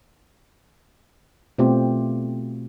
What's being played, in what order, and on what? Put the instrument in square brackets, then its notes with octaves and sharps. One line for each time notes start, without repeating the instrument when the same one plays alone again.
[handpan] B2 A3 C4 F4 G4